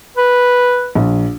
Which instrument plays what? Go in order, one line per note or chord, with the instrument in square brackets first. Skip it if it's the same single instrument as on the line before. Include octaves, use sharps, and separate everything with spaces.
[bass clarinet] B4
[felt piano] A#1